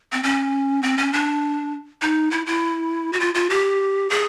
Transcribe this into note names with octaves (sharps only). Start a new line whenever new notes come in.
C4
C#4
C4
C#4
D4
D#4
E4
E4
F#4
F4
F4
G4
G#4